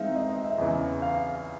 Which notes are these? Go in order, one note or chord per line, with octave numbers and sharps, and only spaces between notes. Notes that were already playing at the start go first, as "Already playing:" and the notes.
Already playing: E3 G#3 C4 D#4 E5 F5
D#5
D#5
E5
E2 C#3 E3
F5